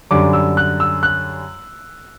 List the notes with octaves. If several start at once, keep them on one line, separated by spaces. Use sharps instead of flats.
F#2 D3 G3 D6
E6
F#6
E6
F#6